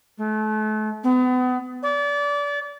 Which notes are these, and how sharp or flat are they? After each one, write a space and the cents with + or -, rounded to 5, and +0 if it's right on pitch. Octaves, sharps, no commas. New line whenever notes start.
A3 -35
B3 +35
D5 -30